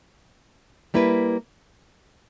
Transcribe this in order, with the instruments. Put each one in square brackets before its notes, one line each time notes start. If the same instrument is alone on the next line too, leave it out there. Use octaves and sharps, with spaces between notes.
[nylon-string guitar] G3 A#3 E4 B4